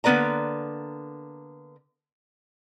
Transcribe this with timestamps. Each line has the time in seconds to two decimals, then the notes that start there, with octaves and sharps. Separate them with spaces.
0.04 D3 A#3 B3 B4 D5 A#5